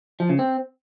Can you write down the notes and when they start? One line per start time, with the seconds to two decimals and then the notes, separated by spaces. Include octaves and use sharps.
0.20 F3
0.29 C#3
0.39 C4